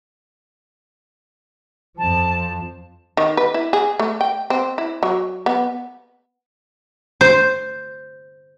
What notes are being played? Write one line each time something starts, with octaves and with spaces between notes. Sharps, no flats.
F2 F3 A5
D#3
B4
E4
G#4
A3
G5
C4
E4
F#3
B3
C5